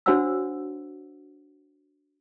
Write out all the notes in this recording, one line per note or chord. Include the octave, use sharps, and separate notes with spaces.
D4 F#4 C5 C#5 F#5 E6